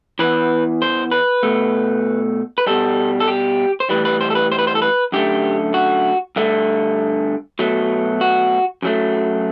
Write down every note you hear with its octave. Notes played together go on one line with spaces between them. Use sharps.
E2 C3 E3 B4
C5
B4
B2 A3
B4
B2 G3 A4
A4
G4
C5
A2 E3 G3 B4
B4
C5
A4
B4
C5
B4
C5
A4
B4
F#2 D3 A3 G4
F#4
G2 D3 A3
B2 F#3 A3
F#4
F#2 F#3 A3